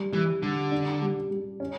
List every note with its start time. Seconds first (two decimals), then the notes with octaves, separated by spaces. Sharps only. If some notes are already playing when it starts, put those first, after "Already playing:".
Already playing: G3
0.13 E3 G3
0.42 D3 G3
0.71 D4
1.01 G3
1.30 G3
1.60 C#4